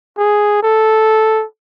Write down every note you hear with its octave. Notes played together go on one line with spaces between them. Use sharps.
G#4
A4